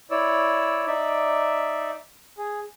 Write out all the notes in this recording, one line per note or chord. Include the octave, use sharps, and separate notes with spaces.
E4 C#5 D5 E6
D#4 D5 E5
G#4